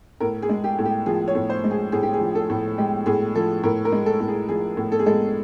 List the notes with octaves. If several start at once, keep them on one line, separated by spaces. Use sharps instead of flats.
A2 A#4
G#4
G#3
G4
A2
G4
F3 G#4
C#5
A2
C5
G#3
G#4
A2 G#4
G4
G#4
F3
A4
A2
G#3 G4
A2 G#4
F3 A4
A2 A#4
A#4
G#3
A4
A2
G#4
F3 G#4
A2
A4
G#4
G#3 A4